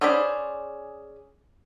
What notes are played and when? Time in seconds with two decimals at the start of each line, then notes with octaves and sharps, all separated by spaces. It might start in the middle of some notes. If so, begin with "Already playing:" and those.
0.01 C#4 G#4 C5 D5 B5